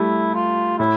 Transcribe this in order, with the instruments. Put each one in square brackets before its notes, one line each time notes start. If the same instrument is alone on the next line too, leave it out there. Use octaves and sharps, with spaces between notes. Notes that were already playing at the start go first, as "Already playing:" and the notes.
Already playing: [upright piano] G3 A3 [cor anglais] E4
[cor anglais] F4
[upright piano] A2 [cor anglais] E4